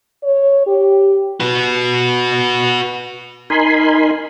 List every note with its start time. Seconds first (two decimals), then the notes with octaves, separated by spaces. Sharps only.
0.23 C#5
0.67 G4
1.40 F#4 B4
3.50 D#4 A#4 G#5 B5 C6